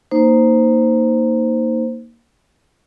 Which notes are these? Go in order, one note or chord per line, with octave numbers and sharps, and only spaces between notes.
A#3 D#4 C5